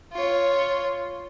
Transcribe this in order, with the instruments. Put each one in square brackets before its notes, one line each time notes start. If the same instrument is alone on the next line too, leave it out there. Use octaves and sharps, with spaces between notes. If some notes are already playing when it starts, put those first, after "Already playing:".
[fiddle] F4 C#5